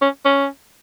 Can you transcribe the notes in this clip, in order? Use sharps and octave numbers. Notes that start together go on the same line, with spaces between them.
C#4
C#4